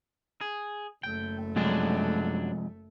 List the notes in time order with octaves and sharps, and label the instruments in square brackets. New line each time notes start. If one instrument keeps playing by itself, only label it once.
[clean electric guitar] G#4
[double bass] F#1 A3 [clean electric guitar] G5
[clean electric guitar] F#2 F#3 D4 [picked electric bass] C3 F3 G#3